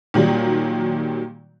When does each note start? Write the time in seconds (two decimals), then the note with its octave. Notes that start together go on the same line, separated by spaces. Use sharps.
0.14 A#2 D#3 F#3 G3